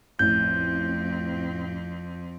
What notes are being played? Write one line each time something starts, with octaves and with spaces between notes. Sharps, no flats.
A1 F2 C4 G6